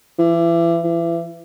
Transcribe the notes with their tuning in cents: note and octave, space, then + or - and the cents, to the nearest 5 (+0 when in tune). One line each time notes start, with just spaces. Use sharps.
E3 +35
E3 +35